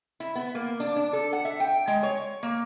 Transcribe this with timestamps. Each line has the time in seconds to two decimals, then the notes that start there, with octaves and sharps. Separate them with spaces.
0.20 E4
0.35 B3
0.55 A#3
0.80 D4
0.96 D4
1.13 A4
1.33 F#5
1.45 E5
1.60 G5
1.87 G#3
2.03 C#5
2.43 A#3